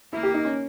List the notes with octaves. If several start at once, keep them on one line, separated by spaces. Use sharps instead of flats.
A#3 E4
G4
D#4
C#4